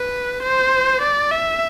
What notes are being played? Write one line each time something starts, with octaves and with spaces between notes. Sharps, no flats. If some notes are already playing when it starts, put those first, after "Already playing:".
Already playing: B4
C5
D5
E5